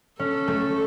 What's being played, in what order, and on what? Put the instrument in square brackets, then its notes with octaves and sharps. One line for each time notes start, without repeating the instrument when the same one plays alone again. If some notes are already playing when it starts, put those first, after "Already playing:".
[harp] C#4 [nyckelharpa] A4
[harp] A3